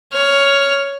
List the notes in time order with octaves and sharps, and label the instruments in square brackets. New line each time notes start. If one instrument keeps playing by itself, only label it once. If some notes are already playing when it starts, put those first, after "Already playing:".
[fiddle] C#5 F6